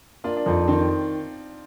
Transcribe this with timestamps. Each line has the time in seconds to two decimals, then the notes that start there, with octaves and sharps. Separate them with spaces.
0.24 A#3 D4 F4
0.37 D4
0.46 F2 C4 D#4
0.68 D#3 C4 D#4